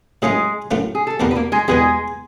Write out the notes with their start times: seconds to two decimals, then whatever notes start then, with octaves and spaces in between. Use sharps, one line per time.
0.22 A2 F#3 G#3 A3 C#4 F4 G#4
0.71 A2 F#3 A3 C#4 F4
0.95 G#4
1.07 A4
1.20 E2 B2 G3 A#3 B3 A#4
1.31 B4
1.35 A#3 A#4
1.52 G#3 G#4
1.68 E2 B2 G3 G#3 B3 G#4